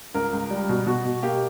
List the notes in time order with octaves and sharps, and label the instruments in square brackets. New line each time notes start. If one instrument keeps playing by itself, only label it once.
[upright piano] C#2 A#4
C#2
G3
B2
B2 F#4
B2
A#3 G4